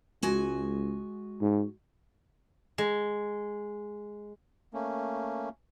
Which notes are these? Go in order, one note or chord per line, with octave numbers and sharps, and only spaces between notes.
C#2 G#3 F#4 G#5
G#2
G#3
A3 A#3 C#4